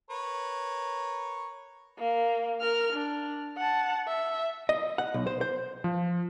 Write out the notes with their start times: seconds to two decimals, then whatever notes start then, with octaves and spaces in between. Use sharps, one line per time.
0.10 A#4 B4 C#5
1.98 A#3
2.61 A#4 F6
2.92 D4
3.57 F#5 A5
4.08 E5
4.69 D#5
4.98 F#5
5.14 B1
5.27 C5
5.41 C5
5.84 F3